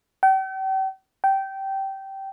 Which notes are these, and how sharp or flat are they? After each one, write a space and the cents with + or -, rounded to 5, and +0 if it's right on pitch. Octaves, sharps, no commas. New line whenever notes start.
G5 -40
G5 -15